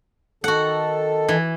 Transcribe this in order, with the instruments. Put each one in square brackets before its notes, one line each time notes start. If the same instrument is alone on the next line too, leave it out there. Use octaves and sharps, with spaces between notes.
[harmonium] D#3 A4 [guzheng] F#4 F#5
[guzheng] E3